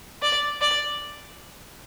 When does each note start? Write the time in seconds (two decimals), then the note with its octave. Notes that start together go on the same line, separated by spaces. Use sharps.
0.22 D5
0.61 D5